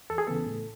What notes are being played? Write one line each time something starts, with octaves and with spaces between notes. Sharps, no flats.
E2 A4
G#4
C#3 E3 B3 A4
A2